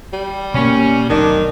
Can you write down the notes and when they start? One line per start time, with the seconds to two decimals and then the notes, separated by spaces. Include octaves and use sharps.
0.13 G3
0.54 B2 A#3 C#4
1.09 F1 B1 D#3 D4